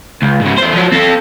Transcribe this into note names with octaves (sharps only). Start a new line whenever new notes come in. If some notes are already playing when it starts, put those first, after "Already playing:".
C#2
G#2 C#3
E2 C5
F3 F#3
C4 A4